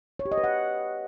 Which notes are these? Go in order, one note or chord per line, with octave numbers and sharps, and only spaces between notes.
C#5
G4
D#5
B4
F#5